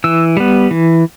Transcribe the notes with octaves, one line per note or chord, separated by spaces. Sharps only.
E3 E6
G3 B3
E3